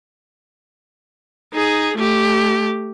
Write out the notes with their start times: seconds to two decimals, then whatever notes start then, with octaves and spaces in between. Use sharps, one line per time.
1.53 D#4 G#4
1.97 A3 G4